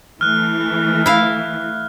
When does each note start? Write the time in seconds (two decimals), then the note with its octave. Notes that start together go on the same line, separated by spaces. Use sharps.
0.21 E3 A3 F6 F#6
1.06 E4 F5